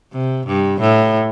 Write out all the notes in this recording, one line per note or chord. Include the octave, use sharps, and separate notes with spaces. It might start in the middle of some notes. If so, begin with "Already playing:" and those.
C3
G2
A2